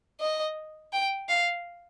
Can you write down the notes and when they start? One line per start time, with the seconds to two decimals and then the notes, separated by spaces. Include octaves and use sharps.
0.21 D#5
0.93 G5
1.29 F5